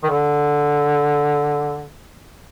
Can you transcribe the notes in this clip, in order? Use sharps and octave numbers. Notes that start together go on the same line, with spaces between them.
D#3
D3